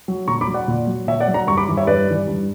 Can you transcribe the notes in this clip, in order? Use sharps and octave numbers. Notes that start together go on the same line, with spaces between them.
F#3
A#2 A#5 C#6
B5 D6
F#3
D5 F#5
A#2
F#3
A#2 C#5 E5
D5 F#5
F#3
F#5 A#5
G2 A#5 C#6
B5 D6
E3 G3
C#5 E5
G2 B4 D5
E3 G3
G2